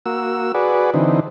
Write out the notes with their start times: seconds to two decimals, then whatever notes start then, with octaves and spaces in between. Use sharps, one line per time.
0.06 A#3 F#4 E6
0.54 F#4 G#4 B4 D5
0.94 D3 E3 C4 D#4